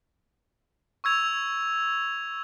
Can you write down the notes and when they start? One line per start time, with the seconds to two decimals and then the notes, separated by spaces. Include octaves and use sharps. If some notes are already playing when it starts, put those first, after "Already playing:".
1.04 C#6 E6 G#6 F7